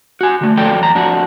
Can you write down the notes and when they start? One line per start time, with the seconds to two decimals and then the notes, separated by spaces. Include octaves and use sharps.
0.21 F#4 G#5
0.41 D3 A3
0.57 F2 F#3 A4 D5 G5
0.81 E2 A#5
0.95 F2 D4 F#4